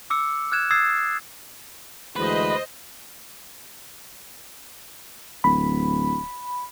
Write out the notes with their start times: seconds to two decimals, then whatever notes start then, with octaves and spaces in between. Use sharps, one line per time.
0.10 D6 E6 C#7
0.52 F6 F#6 G#6 E7
0.71 D#6 E6 G#6 A6 C7
2.16 D2 E3 G#3 B4 C5 D#5
5.44 D1 B5